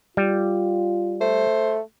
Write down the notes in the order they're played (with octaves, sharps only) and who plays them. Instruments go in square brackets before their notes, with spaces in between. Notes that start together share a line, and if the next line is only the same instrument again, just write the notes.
[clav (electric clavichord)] G3 [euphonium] F4
[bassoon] A3 [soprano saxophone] C5